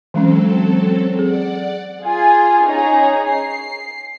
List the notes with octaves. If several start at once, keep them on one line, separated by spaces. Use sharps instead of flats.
E3 F#3 G#3 C4 C#4 A4
G#4 D5 F#5
F4 G#4 G#5
C#4 D#4 G#4 C#5 A#5
C7